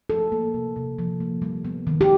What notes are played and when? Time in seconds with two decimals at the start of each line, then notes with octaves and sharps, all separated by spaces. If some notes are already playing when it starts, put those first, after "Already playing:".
0.10 F3 A4
0.32 A#3
0.54 C3
0.76 C3
0.99 F3
1.20 A#3
1.42 G3
1.65 B3
1.87 D#3
2.01 G4